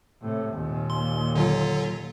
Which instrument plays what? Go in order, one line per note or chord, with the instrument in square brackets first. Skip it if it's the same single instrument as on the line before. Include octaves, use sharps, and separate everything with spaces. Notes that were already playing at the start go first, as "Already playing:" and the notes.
[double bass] A2 C3
D#2 A#2
[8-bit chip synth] C6
D3 F#3 F4